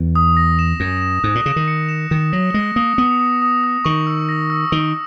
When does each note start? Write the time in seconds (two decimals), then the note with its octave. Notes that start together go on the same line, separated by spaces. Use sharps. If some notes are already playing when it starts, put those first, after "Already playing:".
Already playing: E2
0.15 D#6
0.37 A#6
0.59 E7
0.80 F#2 A#6
1.02 E7
1.24 G#2 F#6
1.35 A#2
1.46 C#3 E7
1.56 D#3
1.68 C#7
1.89 E7
2.11 D#3 E7
2.33 F#3 A#6
2.54 G#3 A#6
2.76 A#3 D#6
2.98 B3 D#6
3.20 D#6
3.42 D#6
3.64 D#6
3.85 D#3 C#6
4.07 E6
4.29 A#6
4.50 E6
4.72 D#3 C#6